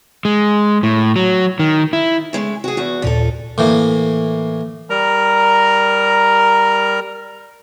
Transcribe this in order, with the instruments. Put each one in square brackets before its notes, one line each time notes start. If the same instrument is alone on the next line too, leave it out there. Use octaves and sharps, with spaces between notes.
[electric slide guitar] G#3
A2
F#3
D#3
E4
[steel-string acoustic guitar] C#3 G#3 A3
F#4 G#4
E2 F#4
[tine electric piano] D#2 A#2 D5 [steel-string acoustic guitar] F3 F4 A4
[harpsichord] A2 E3 A#3
[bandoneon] G3 A#4 A#5